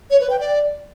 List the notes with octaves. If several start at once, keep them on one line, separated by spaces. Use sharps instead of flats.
C#5
B4
G5
D5